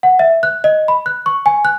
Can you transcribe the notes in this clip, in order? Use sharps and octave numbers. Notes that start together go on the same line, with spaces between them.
F#5
E5
F#6
D#5
B5
F#6
C#6
G#5
F#6